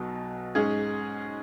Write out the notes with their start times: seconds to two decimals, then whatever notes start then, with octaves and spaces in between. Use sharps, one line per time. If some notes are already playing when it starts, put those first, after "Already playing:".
Already playing: B1 B2 F#3
0.55 G#2 G#3 C#4 G#4